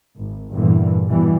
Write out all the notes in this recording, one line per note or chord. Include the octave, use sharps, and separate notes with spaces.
G#1
E2 G2 A#2 D3 E3
B2 E3 G3